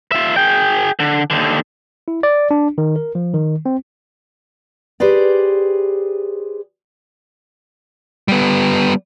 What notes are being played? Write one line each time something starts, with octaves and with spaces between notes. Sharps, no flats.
F4 E5
G#4 G5
D3
D#2 D3
E4
D5
D4
D#3
A#4
F3
D#3
C4
G4 G#4 B4 C5 D5
G3 B3